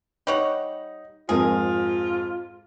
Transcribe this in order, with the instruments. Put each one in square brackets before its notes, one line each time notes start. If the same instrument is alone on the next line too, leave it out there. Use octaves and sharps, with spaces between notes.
[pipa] G3 C#5 F#5 [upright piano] D#4
[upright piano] F2 G#2 A#4 [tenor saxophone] F4 [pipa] G#4